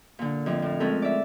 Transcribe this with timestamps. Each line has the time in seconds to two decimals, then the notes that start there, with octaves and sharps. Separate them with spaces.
0.19 A#2 D3
0.46 F2 A2
0.62 A2
0.80 G#3 A3 C4 C#4 A4 A#4
1.02 D5 E5